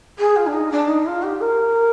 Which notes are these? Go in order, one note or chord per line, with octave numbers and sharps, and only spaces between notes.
G#4
F4
D4
D#4
D4
D#4
F4
G4
A#4